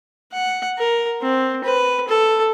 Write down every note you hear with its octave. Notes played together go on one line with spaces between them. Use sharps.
F#5
A#4
C4
B4
A4